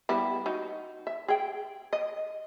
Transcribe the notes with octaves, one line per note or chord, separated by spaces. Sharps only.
G3 B3 E4
D#4 F#4
E5
G#4 G5
D#5